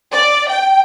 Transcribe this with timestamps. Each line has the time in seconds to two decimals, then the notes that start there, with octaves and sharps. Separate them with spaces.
0.12 D5
0.49 G5